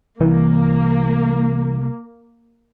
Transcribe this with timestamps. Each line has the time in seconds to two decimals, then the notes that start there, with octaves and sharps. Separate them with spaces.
0.21 C3 E3 G3 A#3